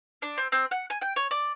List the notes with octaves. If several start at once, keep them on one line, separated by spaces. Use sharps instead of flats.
D4
C4
C4
F#5
G#5
G5
C#5
D5